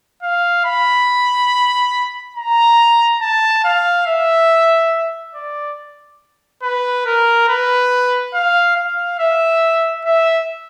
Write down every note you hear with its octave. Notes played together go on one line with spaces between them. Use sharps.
F5
B5
A#5
A5
F5
E5
D5
B4
A#4
B4
F5
F5
E5
E5